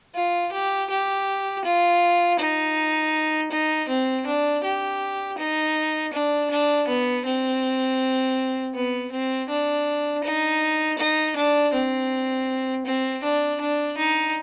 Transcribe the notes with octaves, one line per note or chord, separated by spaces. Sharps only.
F4
G4
G4
F4
D#4
D#4
C4
D4
G4
D#4
D4
D4
B3
C4
B3
C4
D4
D#4
D#4
D4
C4
C4
D4
D4
D#4